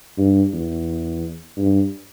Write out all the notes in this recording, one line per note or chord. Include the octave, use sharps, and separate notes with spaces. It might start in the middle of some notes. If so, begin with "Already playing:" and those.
G2
E2
G2